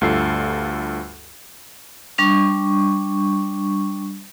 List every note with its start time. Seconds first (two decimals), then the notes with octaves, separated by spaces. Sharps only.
0.01 D2 G2 F4 A4 C7
2.18 G3 D4 C#6